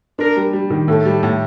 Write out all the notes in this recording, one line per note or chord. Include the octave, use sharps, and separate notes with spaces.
D4 A#4
G3
G3
D#3
A2 A4
G3
A2